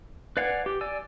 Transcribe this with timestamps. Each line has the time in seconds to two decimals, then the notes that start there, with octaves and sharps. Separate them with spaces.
0.37 B4 D5 F5 F#5 G#5
0.66 G4
0.81 D5 G#5 E6